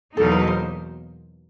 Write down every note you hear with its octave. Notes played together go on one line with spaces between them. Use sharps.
E2 B2 F#3 A#3 D#4 A4
B4
C5